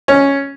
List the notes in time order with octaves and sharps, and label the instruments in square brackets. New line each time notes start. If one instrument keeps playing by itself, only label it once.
[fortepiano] C#4